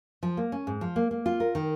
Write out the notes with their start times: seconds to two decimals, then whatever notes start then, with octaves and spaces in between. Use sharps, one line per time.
0.23 F3
0.37 A#3
0.52 C#4
0.67 G#2
0.81 F3
0.96 A#3
1.11 A#3
1.26 F4
1.40 A#4
1.55 D#3